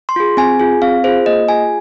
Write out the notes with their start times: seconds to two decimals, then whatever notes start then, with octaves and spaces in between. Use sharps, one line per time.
0.09 C6
0.16 F4 G#4
0.37 C4 G#5
0.60 F4 G#4
0.82 C4 F5
1.04 F4 G#4 C5
1.26 A#3 D#5
1.48 F4 G#4 G#5